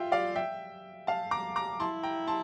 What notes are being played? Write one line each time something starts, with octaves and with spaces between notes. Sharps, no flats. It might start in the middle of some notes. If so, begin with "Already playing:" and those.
Already playing: F4 E5 G5
D5 F5
E5 G5
F5 A5
A#5 D6
A#5 D6
E4 A5 C6
G5 A#5
A5 C6